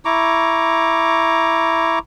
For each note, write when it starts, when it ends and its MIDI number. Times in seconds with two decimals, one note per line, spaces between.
0.05 1.99 64
0.05 1.99 82
0.05 1.99 85
0.05 1.99 86